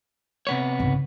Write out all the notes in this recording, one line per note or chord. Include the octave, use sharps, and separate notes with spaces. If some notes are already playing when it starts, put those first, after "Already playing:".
C3 B3 C#5
G#1 C#3